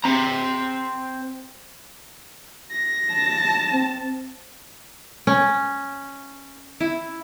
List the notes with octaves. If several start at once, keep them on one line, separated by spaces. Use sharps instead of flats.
C4 A#5
A#6
A5
C4
C#4
E4